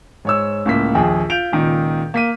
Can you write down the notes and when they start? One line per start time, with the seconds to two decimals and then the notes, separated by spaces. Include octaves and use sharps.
0.25 G#2 C#5 E6
0.65 C#2 A2 A#3 B6
0.95 A#1 D#2 G#4 G5
1.30 F4 G6 D7 F7
1.52 C#2 A#2 D#3
2.14 A#3 B6 D#7